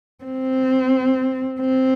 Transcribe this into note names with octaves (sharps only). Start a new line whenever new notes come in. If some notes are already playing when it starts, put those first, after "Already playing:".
C4
C4